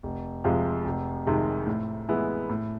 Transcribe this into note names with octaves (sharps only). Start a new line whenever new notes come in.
F1
F2 C3 F3 G#3
F1
F2 C3 D#3 G#3
A2
E3 G#3 B3 E4
A2